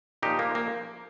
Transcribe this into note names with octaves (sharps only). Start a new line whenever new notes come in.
A#2 F3 D#4 G4
A#3
A#3